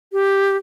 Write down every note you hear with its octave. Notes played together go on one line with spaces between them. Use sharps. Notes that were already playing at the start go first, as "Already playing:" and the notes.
G4